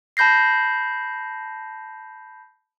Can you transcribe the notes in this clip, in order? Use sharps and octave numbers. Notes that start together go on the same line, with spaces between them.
A5 B5 G6 A#6 C7